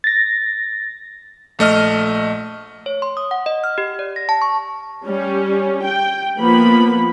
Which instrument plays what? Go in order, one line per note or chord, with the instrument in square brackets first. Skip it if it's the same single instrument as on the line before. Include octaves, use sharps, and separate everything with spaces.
[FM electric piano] A6 A#6
[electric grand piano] A#1 A3 D#5 F6
[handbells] C#5
C6
D#6
F#5
D#5
F6
G4
D5
A#6
A5
C#6
[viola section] G3 C#4
G5
F3 A#3 B3 B5